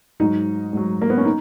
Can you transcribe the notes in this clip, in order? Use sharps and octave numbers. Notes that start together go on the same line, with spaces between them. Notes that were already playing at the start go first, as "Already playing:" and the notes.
G#2 F#3 D#4
G#2 F#3
A#3
B3
C#4
D#4